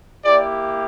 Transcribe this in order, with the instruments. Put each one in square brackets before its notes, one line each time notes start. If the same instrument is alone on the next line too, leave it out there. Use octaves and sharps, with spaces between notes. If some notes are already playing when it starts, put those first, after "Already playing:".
[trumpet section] A#3 E4 G4 D5